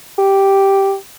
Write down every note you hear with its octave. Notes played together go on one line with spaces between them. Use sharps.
G4